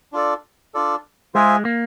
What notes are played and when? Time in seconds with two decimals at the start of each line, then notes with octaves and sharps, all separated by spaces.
0.12 D4 F4 A4 D5
0.74 D4 F4 A4 D5
1.34 G#3 F4 G#4 C5 E5
1.65 A#3